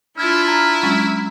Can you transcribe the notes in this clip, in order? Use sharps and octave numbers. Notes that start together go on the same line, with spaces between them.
D4 E4 F4 F6 G#6 A6
A#5 F6
F#3 G#3 C#4